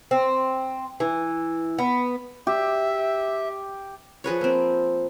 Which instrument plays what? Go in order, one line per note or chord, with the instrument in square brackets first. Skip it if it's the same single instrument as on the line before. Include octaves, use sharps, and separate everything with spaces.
[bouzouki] C4
E3
B3
[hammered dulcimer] G4 [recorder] E5
[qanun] F3 G#4 B4 C#5
A#3 C4